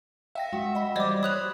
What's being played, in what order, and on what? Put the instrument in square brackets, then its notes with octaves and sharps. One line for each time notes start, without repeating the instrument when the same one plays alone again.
[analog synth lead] E5 [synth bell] F5 G5 A#6
[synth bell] G#3 [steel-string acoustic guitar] F#4
[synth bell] D#5 B5
[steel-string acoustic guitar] E3 F3 [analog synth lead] G3 [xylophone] C5 D5 D#5 [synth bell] D6 G#6
[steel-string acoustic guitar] C5 [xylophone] C#5 F#6 F7 [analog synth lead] B5 [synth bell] D#6